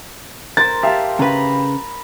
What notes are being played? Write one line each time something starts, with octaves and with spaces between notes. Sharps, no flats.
A#4 C5 A6
G4 E5 F5 A5 A#5
C#3 B4 A#5 B5